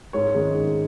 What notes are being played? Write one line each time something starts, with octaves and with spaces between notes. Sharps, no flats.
G#2 C#5
D#3 G#3 C#4
G#2